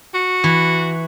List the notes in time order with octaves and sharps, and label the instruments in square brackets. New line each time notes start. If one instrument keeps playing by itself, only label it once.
[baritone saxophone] F#4
[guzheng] E3